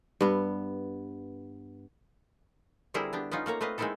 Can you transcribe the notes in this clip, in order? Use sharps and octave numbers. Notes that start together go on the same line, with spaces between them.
G2 B3
D3 G3 C4 E4 G#4 A#4
B3 D4 G4
B3 C#4 D#4 F4
A3 A#3 C#5 A#5
A3 C4 B4 D#5 F5
G#3 A#3 C4 D#4 E4 A4